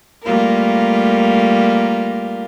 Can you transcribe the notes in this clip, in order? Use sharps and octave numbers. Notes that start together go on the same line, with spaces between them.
G3 A3 A#3 F4 A#4